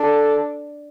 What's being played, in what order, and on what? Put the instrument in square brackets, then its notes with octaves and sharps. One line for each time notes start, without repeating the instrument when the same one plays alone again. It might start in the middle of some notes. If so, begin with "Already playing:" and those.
Already playing: [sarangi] D4 [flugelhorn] A4